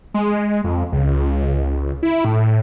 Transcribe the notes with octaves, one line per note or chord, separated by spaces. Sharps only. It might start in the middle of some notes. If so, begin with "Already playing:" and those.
G#3
F2
C#2
E4
A2